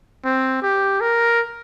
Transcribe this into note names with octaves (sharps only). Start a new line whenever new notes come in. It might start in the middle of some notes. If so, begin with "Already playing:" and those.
C4
G4
A#4